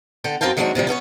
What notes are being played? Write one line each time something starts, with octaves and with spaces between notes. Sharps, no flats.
D3 A4 G5
F#2 C4 A#4 F5 G5 A5
D#3 F#3 G#3 B3 C4 D4
C3 D#3 F3 G3
B3 C#4 A4 C#5